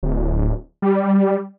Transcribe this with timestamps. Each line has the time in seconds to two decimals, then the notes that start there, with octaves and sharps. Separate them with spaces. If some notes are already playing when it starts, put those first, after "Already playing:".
0.03 D1
0.82 G3